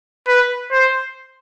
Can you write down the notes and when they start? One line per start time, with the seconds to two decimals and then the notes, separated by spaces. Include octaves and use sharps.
0.27 B4
0.72 C5